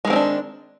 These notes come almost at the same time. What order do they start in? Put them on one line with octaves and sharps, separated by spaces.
G#3 D#3 C4 D#4 D4